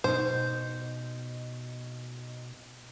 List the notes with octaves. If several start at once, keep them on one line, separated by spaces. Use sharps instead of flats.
B2 D#4 C5